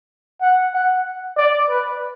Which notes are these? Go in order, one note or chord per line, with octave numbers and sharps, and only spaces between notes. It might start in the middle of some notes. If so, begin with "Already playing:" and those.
F#5
F#5
D5
B4